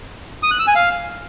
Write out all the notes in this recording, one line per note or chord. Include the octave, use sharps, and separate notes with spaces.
D#6
F#6
E6
G#5
F5